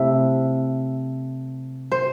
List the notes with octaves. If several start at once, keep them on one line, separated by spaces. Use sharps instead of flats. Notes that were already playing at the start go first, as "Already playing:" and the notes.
Already playing: C3 A3 E4
C5